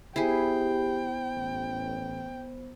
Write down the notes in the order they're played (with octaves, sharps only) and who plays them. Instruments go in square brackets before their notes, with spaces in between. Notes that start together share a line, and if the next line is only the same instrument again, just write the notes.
[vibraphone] B3 C5 [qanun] E4 G#4 [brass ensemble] G4 [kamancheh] G5
[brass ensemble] A1